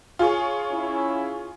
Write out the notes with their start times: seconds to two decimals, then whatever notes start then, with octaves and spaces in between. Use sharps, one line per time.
0.19 F4 G#4 C#5
0.72 C#4 E4